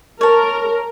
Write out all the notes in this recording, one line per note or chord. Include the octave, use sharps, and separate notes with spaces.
A#4 C#5 A5